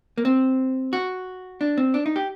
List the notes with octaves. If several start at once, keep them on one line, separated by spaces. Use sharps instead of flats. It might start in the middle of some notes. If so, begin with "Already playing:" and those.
A#3
C4
F#4
D4
C4
D4
D#4
G4